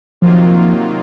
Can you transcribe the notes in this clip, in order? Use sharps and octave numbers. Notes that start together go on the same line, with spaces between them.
C3 D#3 F3 F#3 A#3 F4